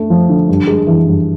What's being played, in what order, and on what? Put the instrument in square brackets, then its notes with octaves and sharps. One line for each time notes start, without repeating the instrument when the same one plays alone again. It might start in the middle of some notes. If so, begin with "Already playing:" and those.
Already playing: [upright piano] A3 D4
F3
D3
G2
G#3
E3
G2